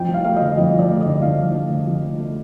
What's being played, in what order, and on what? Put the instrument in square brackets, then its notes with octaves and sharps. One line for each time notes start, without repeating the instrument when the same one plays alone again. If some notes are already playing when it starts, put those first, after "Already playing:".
Already playing: [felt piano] F2 G5
F3
F5
A3 F5
D3 D#5
F2 D#5
F3
D5
A3
D#5
D3
F2 F5
F3
A3
D3
F2
F3
A3